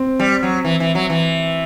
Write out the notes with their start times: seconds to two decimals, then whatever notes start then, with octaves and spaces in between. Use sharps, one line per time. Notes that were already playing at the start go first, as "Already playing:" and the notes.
Already playing: C4
0.20 G3
0.43 F#3
0.65 E3
0.80 E3
0.95 F#3
1.10 E3